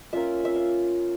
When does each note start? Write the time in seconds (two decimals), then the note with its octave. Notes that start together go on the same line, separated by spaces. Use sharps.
0.13 A#3 C#4 F4 E5
0.45 E5
0.56 F5